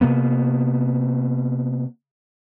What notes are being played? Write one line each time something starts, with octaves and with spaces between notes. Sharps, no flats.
C3 A#3 B3